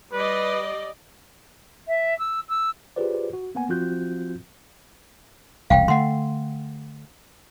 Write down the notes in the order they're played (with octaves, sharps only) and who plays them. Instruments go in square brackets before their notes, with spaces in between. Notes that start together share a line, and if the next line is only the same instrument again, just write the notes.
[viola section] G3 D5 D#5 [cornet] B4
[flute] E5
E6
E6
[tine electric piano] F4 G4 G#4 B4 C5 D5
F#4
A#3 B3 F#5 G#5
F3 C4 F4 F#4 F#6 G6
[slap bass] E1 C2 [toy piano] F5 G5
[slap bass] D3 A3 [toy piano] F#5 C6